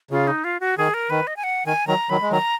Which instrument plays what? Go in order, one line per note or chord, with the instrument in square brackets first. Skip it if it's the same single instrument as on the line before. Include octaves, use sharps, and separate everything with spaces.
[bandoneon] C#3 [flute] F4
[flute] D#4
F4
F#4
[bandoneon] D#3 [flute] G#4
[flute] A#4
[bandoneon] D#3 [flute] B4
[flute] D#5
G#5
F#5
[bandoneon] D#3 [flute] G#5
[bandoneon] D#3 F#3 [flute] A#5
[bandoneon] D#3 F#3 [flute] B5
[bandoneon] G#3
[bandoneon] D#3 F#3 [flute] A#5